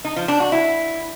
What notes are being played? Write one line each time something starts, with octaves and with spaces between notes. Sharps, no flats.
D#4
F3
D4
F#4
E4